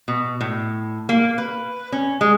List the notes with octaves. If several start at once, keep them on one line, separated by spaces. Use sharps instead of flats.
B2
A2
A#3
B4
C#4
G#3